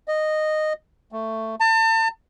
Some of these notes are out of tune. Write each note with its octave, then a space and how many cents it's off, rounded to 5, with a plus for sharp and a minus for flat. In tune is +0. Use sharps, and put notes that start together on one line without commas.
D#5 -10
A3 +15
A5 +35